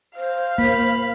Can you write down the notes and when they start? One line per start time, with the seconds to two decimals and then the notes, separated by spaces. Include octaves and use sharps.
0.17 C5 F5
0.58 A#3 B5